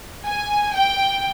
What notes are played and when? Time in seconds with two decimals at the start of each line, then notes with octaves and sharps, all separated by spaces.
0.25 G#5
0.73 G5